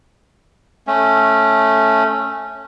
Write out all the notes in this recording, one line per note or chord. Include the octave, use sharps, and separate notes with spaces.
A3 C#4